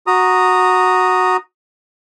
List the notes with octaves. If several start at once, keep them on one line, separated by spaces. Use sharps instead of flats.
F#4 A#5 D#6